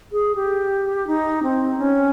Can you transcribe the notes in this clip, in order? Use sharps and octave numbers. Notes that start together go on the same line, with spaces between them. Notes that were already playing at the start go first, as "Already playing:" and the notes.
G#4
G4
D#4
C4
C#4